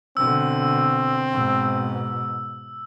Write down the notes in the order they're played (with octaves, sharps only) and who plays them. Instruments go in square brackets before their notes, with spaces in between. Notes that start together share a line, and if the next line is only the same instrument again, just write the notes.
[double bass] B2 D3 [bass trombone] C4 [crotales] E6
[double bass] G#2 B2